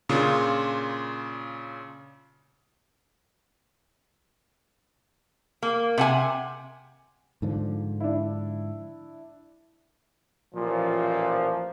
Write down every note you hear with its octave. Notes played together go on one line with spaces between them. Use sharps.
A#2 C#3 D4 F4
A#3
C3 F#5 G#5
G#2 D3 F3
D4 E4
A1 A#2 F3